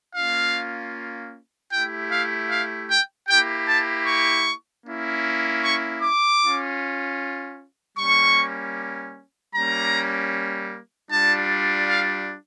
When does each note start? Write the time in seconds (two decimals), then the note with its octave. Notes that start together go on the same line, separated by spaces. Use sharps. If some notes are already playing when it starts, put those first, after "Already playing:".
0.15 A#3 C#4 F4 F5
1.72 A3 E4 G4 G5
2.11 F5
2.50 F5
2.90 G5
3.28 A#3 E4 G4 G5
3.68 A5
4.06 C#6
4.85 A#3 C#4 E4
5.63 C#6
6.02 D6
6.41 C#4 F4
7.98 G3 A#3 C#4 C#6
9.54 G3 A#3 C#4 A#5
11.11 G3 D4 F4 A5
11.88 F5